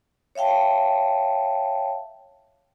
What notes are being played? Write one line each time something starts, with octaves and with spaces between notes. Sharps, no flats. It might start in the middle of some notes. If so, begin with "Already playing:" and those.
C#5 E5 F5 G5 A5